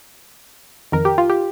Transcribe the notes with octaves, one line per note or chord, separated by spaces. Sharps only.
F2 D#3 A#4
G4
F4
G4